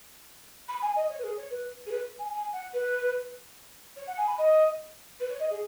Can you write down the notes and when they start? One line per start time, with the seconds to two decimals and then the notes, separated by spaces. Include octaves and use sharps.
0.68 B5
0.82 G#5
0.96 D#5
1.09 C#5
1.18 B4
1.23 G#4
1.37 C#5
1.50 B4
1.86 G#4
1.91 B4
2.19 G#5
2.32 G#5
2.53 F#5
2.73 B4
3.96 C#5
4.07 F#5
4.17 G#5
4.27 B5
4.38 D#5
5.20 B4
5.30 C#5
5.39 D#5
5.50 G#4